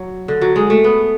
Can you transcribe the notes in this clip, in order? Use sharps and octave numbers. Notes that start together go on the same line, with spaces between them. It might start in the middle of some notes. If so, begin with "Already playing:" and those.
Already playing: F#3
D3
F#3
G#3
A3
B3